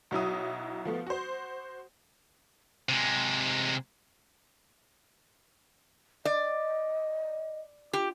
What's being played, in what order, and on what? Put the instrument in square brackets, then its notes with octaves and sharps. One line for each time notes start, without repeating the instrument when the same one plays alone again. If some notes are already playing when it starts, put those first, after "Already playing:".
[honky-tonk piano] B1 F#3 E4 D#6
F3 A3 B3
F#4 C5
[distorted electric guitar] C3 G#3
[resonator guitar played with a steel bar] D5 [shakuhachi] D#5
[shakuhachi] F4 [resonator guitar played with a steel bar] G4